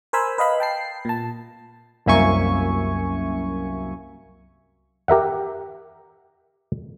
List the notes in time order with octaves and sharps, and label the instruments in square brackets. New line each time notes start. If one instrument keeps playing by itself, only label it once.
[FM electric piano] A#4 C5 G#5 B5 E6
B4 D#5 F5 B5
G5 A5 C7
A#2 A5
[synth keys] C2 F#2 A#3 E5 G#5 C#6
[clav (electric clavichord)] G4 A#4 E5 F#5